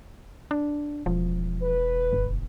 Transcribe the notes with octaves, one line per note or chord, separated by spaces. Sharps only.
D4
E1 F3
B4
G1